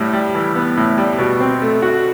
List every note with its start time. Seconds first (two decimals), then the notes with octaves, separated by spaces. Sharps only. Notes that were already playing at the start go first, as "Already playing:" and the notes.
Already playing: A2 G3
0.13 G3
0.35 E3
0.56 B3
0.77 A2
0.98 G3
1.18 B2
1.40 C4
1.62 A3
1.82 F#4